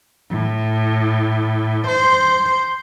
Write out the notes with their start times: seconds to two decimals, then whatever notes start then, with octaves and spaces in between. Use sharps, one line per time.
0.30 A2
1.87 C5